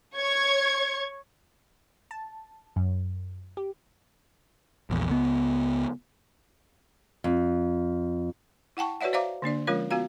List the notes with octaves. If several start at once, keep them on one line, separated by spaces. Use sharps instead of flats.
C#5 C#6 G#6
A5
F#2
G4
A#1 E2
C#2 B3
F2
E4 F#5 G5 A5 C#6
F#4 B4 C#5 D5 E5 F#5
C5 D5 E5 F5 A#5 D6
D3 A#3 D4 D5
F3 G#3 C#4 F4 A#4 C#5
B3 F4 F#4 F5 A#5